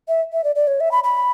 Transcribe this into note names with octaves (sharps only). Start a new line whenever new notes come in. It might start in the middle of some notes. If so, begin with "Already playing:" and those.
E5
E5
D5
D5
C#5
E5
B5
B5